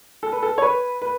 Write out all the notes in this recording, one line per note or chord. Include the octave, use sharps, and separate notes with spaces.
A4
B4
A4
C#5
B4
B4